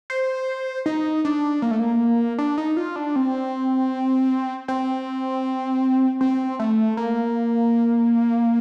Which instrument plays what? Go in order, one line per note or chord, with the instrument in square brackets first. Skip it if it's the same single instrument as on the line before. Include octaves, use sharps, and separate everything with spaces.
[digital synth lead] C5
D#4
D4
A#3
A3
A#3
D4
D#4
F4
D4
C4
C4
C4
A3
A#3